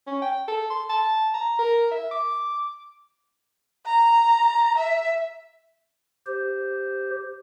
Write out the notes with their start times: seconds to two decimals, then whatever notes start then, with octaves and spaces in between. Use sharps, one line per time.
0.07 C#4
0.22 G5
0.48 A4
0.70 C6
0.89 A5
1.34 A#5
1.59 A#4
1.91 E5
2.11 D6
3.86 A#5
4.78 E5
6.27 G4 C5